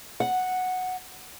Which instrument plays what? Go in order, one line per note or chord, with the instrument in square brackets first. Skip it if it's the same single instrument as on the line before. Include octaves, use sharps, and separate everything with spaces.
[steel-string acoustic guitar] F#5